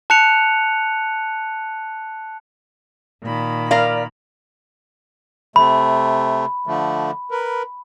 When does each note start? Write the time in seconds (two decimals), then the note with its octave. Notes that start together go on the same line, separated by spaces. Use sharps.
0.10 A5 F#6 C#7 F7
3.22 A#2 D#3 B5
3.71 A#4 D5 F5
5.56 C3 A3 B5
6.67 D3 F3 A3
7.31 A#4 B4